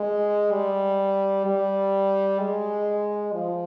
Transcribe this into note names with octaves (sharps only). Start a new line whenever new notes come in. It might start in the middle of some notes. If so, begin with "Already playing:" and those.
Already playing: G#3
G3
G3
G#3
F3